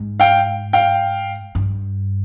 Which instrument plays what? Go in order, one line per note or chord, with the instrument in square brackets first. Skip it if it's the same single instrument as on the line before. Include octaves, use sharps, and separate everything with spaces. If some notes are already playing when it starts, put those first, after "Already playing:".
Already playing: [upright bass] G#2
[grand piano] F5 G5
F5 G5
[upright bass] G2